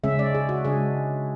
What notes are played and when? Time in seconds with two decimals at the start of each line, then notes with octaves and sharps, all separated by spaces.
0.04 C#3 G#3 C#4 E5
0.19 D5
0.34 G#4
0.49 F#4
0.65 C#3 G#3 D4 G#4